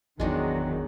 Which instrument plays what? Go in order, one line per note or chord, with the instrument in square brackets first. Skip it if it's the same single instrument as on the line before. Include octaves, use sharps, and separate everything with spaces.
[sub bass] G#1 [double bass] E2 F#3 [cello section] D#3 [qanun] G#3 D4 F#4